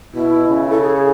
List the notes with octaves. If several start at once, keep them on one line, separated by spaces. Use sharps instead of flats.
B2 E4
C#3
A4
G#4